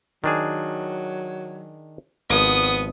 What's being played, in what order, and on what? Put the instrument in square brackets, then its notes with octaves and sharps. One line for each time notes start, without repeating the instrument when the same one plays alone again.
[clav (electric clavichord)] D#3 D4 G#4 [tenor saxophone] F#3
[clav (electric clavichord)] G#1 F3 [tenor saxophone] B3 [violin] D#6